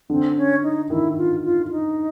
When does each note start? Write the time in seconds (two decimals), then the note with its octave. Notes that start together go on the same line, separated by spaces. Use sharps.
0.10 D3 C4
0.37 C#4
0.63 D#4
0.90 D#3 E4
1.17 F4
1.44 F4
1.71 D#4